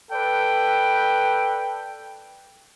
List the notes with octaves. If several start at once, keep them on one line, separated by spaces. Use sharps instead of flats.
A4 B4 D5 G5